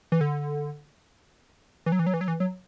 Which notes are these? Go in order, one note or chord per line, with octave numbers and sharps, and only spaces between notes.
E3
D3
E3
F#3
E3
F#3
E3
F#3
E3
F#3